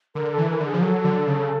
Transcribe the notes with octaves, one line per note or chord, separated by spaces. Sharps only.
D3 A#4
A4
E3
A#4
D3
G#4
F3
F#3 A4 A#4
D3
C#3